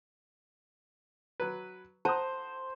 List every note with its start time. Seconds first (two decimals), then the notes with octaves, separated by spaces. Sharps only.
1.40 F#3 B4
2.05 C5 F#5 A5 A#5 D#6